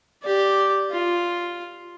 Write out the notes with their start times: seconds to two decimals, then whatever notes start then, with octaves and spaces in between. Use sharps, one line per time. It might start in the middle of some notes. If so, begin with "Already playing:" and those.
0.23 G4 D5
0.91 F4